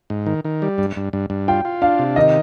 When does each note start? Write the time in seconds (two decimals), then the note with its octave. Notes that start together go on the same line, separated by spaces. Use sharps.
0.10 G#2
0.26 D#3
0.45 D#3
0.62 G3
0.78 G2
0.96 G2
1.13 G2
1.30 G2
1.48 F4 G5
1.65 F4
1.82 D4 F5
1.99 C3
2.16 D#3 D#5